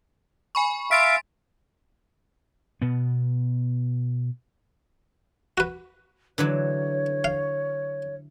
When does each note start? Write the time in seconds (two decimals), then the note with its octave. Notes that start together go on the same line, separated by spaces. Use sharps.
0.55 G#5 B5 C#6
0.91 E5 F5 C6 A6 B6 D7
2.82 B2 B3
5.58 F#4 B4
6.38 D3 E3 F#3 C#5
7.24 F5